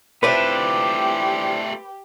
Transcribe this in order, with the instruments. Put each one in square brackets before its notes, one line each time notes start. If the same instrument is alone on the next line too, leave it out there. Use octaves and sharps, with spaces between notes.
[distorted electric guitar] A3 F4 [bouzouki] C4 D4 E4 [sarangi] G4 [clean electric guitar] B4